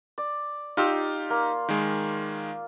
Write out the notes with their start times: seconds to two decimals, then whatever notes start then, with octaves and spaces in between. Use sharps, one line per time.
0.18 D5
0.77 D#4 F4 G4 E6
1.30 A#3
1.69 D#3 G#3